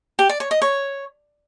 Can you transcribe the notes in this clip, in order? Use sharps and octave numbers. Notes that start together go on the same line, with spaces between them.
G4
D5
C#5
D#5
C#5